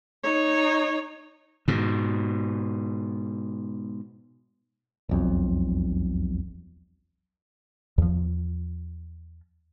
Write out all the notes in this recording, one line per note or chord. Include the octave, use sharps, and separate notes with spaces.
D#4 C#5
G#2 B2
E1 B1 F2
E2 F3